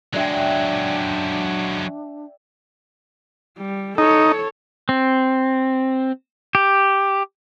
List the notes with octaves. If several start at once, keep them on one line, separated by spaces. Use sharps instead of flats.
F#3 G#3 D4 D5 E5 G5
G3
D#4 A4 C#5
C4
G4